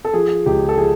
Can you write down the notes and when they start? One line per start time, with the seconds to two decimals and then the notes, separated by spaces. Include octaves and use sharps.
0.05 A4
0.13 F3 G#4
0.46 C#2 G4
0.69 A4
0.77 F3 G#4